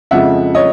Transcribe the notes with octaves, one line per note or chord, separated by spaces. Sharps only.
F2 C#3 F3 G#3 E5 F#5
C#5 D#5